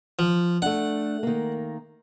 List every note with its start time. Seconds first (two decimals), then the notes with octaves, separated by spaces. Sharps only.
0.19 F3
0.62 A3 D4 F#5
1.23 D#3 A#3